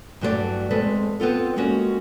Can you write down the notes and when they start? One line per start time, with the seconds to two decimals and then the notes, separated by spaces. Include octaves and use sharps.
0.21 G2 E3 F#3 A3 B4 D5
0.71 E2 G#3 A3 C4 A4 B4
1.20 B3 C4 F4 A4
1.56 G3 G#3 A#3 C#4 F#4